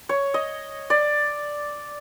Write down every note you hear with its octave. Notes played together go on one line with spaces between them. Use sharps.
C#5
D#5
D5